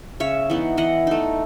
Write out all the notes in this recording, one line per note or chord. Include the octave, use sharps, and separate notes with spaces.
C#3 C#5 E5
E3 B3 D#4
E3 D#5 F#5
A3 D#4